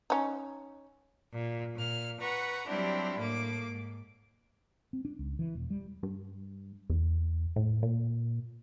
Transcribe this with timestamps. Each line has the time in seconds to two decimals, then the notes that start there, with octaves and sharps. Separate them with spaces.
0.10 C#4 D#4
1.34 A#2
1.75 A#2 F6
2.21 B4 F#5 A#5 C#6
2.67 F#3 G3 C4 D4 E4 G4
3.18 A2 A#3 D6
3.70 G#2
4.93 C4
5.05 D4
5.19 C#2
5.39 E3
5.55 E1
5.70 G3
6.03 G2
6.90 E2
7.56 A2
7.83 A#2